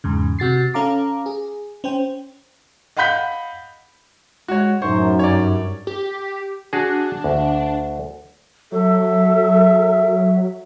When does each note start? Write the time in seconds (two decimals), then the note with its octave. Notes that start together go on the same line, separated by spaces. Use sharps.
0.04 E2 G#2 C#3
0.39 C3 F#4 A6 C7
0.74 C#4 A4 F5 A#5 D6
1.26 G#4
1.84 C#4 C5 G5
2.97 D#5 F5 F#5 B5 G6 B6
4.48 G#3 F#4 C#5
4.82 F#2 A2 D#4 C5 C#6
5.19 G2 C#5 D5
5.87 G4
6.73 D4 F#4 G#4
7.24 D2
8.72 F#3 A4 E5